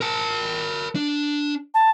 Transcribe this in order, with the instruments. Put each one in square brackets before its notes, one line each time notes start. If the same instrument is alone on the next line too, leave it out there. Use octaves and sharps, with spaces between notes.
[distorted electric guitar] A#4 A5
D4
[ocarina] A5